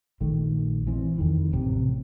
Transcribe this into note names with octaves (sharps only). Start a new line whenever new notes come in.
A#1 D#3 A3
E3 C4
F2 D#3 E3
A1 C3